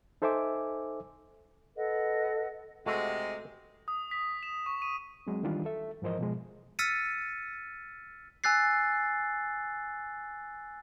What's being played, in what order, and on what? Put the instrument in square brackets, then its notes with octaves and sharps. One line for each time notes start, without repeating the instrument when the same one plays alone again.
[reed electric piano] D#4 A4 C5 E5 G#5 D6
[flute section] A4 B4 D#5 F#5
[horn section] C3 G#3 [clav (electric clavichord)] A3 F#4
[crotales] D#6
B6
E7
C#6
D#7
[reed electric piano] F#3 G#3 C4
D#3 E3 G3 D4 F4
A4 E5
G#2 E3 F3 A#4 C5 D#5
B2 F3 G#3
[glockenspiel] E6 F6 A6 B6 C#7 D#7
G#5 E6 F#6 A6 C7